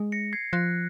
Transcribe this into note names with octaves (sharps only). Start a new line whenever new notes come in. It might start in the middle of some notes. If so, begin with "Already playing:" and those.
Already playing: G#3
A#6 C#7
G#6 C7
F3 F#6 A#6